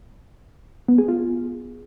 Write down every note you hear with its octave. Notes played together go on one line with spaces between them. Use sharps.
B3
G#4
F4